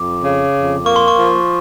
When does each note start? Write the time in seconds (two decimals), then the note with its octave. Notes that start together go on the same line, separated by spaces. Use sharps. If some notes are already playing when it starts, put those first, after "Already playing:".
Already playing: F2 D6
0.23 C#3
0.54 F2
0.86 A#3 C#6
0.96 C6
1.08 C#6
1.17 F3